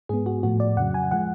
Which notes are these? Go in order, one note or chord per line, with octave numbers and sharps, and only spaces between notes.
G#2 G#3 B3 G#4
F#4
A2 F3 A3 F#4
D5
F2 C#3 F#3 F#5
G#5
F3 G#3 F#5